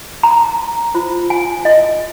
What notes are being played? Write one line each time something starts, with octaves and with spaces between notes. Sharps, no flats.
A#5
F4 C5
G#5
D#5